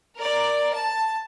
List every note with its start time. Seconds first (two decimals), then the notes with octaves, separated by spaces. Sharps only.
0.17 A#4 D5
0.74 A5